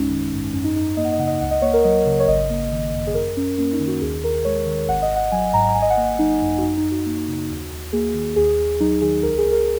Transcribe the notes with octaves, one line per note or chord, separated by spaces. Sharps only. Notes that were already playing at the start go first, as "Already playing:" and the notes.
Already playing: A#1 F#2 G#3 C#4 D#4
D#3
G#2
F#2 C#4
D#4
F#2 D#4
D#4
A#3 D#5
F#5
D#5
C#3 F#5
D#5
C#2 F#5
D#5
A#3 C#5
A#4
F#3 D#5
C#3
C#5
G#1 D#5
A#3
D#3
F#2
G#4
F#2 A#4
F#2 C#4
A#3 C#4
D#4
D#3
F#4
D#2 G#4
D#2 A#4
G#3 C#5
D#3
G#1 F#5
D#5
G#1
F#5
F#3 G#5
G#2 A#5
A#5
G#1 G#5
D#5
F#5
A#3 D#5
F#5
F#3 D#4
F#2
F#4
F#2 D#4
D#4
F#2
F#4
A#3
C#3
D#2
D#2
A#3 G#4
D#3
D#2 G#4
D#2
F#3 D#4
D#3 G#4
C#2 A#4
G#4
C#2
A#4